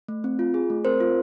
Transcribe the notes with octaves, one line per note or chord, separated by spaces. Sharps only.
A3
C4
F4
G#4
A3
C4 A#4 C5
F4